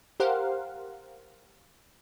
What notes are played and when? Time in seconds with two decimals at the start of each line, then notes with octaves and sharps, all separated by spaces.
0.20 G4 A#4 C5 F5 F#5